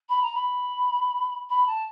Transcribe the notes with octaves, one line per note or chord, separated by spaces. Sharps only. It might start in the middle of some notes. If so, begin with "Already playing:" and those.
B5
A#5
B5
B5
A5